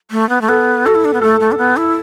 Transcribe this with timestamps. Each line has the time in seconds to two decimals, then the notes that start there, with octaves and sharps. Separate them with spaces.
0.11 A3
0.29 B3
0.41 A3
0.48 B3 A4
0.85 F#4 A4
0.95 E4
1.05 D4
1.14 B3
1.21 A3 A4
1.40 A3
1.52 D4
1.58 B3
1.77 E4